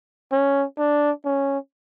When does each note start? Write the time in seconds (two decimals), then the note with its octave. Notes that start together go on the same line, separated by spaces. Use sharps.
0.32 C#4
0.78 D4
1.25 C#4